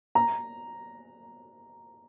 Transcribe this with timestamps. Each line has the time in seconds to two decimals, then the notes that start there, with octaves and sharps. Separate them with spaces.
0.15 A#5